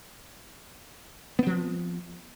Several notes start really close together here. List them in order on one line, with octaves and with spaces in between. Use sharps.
B3 C4 F3